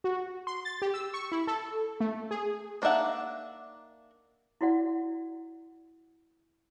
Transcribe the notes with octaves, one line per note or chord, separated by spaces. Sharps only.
F#4
C6
A6
G4
E6
C#6
E4
A4
A3
G#4
A#3 D4 D#4 E5 F#5
E4 F#4 D5 F#5